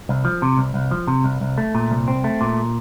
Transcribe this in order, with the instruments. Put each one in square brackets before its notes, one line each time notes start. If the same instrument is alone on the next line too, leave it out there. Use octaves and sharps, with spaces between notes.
[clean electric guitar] C2
F3
C3
C2
C2
F3
C3
C2
C2
A3
A#2
C2
C4
A3
A#2